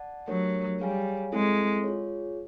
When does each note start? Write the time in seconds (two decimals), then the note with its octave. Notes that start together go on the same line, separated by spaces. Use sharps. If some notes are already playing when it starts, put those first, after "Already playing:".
Already playing: D5 F#5 A5
0.28 F#3 A3 D4 G4 A#4 C#5
0.80 G3 G#4 C#5 F5 G#5
1.32 G#3 C4 E4 A4
1.84 F4 G#4 C#5